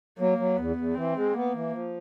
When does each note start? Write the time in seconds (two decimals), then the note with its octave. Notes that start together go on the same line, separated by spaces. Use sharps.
0.18 F#3 A#3
0.38 F#3
0.57 E2 B3
0.76 E2
0.95 E3 C4
1.15 G#3
1.34 A#3 B3
1.53 E3
1.71 F3